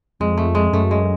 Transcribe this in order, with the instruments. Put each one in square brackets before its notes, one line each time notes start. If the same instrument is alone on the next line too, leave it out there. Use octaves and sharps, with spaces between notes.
[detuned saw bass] F2 [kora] G#3
[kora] A3
G#3
[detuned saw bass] F#2 [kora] A3
[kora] G#3